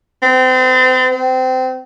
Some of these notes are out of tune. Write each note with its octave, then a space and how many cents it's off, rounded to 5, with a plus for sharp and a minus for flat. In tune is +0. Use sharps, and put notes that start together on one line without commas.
C4 -35
C4 -25